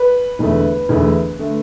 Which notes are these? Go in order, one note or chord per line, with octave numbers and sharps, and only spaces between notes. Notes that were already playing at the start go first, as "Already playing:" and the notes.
Already playing: B4
E1 E2 D3 A3
E1 E2 D3 A3
D3 A3